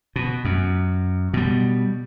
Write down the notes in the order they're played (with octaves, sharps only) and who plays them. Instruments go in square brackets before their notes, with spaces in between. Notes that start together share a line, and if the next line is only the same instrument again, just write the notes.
[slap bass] B2
F#2
B2 G3